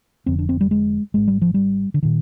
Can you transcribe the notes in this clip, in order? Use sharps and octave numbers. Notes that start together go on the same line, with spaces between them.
F1 F2 D3 C4
D4
C4
G3
G#3
G#1 G#2 G#3
G3
F3
G3
D3
A#2 D#3